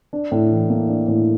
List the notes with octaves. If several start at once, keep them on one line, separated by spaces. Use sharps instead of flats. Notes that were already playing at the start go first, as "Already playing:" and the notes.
D4
A2
E3
A#3
D4
A2